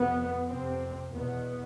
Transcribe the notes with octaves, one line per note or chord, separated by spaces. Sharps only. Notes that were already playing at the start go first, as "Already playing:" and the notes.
Already playing: F2 C3 B3
F2 C3 C4
E2 B2 B3